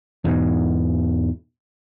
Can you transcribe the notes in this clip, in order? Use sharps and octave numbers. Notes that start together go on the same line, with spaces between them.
E2 G#2 B2